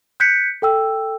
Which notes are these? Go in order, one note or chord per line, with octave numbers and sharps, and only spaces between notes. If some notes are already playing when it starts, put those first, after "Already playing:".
F#6 G6 B6 C#7
A4 G5 E6